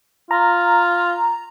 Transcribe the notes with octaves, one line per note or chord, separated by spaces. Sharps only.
F4 A#5